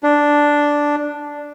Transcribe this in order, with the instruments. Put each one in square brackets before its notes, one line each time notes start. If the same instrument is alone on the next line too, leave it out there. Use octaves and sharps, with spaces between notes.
[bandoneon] D4